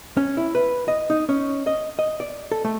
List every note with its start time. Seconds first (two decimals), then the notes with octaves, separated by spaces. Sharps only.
0.17 C#4
0.37 E4
0.55 B4
0.88 D#5
1.10 D#4
1.29 C#4
1.67 D#5
1.99 D#5
2.20 D5
2.52 A4
2.65 A3